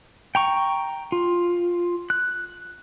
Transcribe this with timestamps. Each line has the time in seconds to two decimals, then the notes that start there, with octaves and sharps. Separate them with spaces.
0.35 G5 A#5 C#6
1.12 F4
2.10 F#6